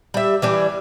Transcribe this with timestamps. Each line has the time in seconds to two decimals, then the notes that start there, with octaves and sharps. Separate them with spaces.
0.14 G3 E5
0.42 E3 G3 D4